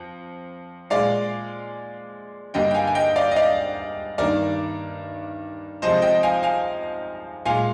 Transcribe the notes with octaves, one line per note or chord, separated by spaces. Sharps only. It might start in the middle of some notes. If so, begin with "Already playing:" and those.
Already playing: F2
A#2 G#3 D5 F5
G2 D3 G3 A#3 D#5 G5
G5
F5 G#5
G#5
D#5 G5
D5 F5
D#5
D5 F5
G2 D#3 A#3 A#4 D5
F2 C3 F3 G#3 C5 D#5
D#5 G5
F5 G#5
F5 G#5
A#2 G#3 F5 G#5